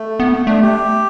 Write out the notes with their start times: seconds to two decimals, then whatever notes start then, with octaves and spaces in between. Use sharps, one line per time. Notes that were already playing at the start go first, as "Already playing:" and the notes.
Already playing: A3
0.20 B3
0.47 A3 D4
0.62 G4